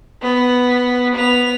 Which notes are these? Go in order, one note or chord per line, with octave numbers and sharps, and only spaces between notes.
B3
B3 F7